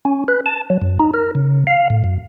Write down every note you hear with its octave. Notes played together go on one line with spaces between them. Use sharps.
C#4
B4
A5
F#3
F#2
D#4
A#4
C#3
F5
A2
F#2